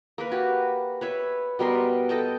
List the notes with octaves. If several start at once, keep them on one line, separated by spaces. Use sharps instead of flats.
A#3 A#4 B4
F#4 G4
B4 C#5 E5
B2 G3 A#4 C6
A4 D#5 G5 A5